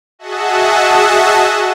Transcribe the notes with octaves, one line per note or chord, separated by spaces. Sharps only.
F#4 G#4 D#5 E5 F#5 A5